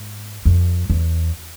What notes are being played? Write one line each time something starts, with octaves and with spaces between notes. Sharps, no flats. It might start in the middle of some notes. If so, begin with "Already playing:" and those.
Already playing: G#2
F2
E2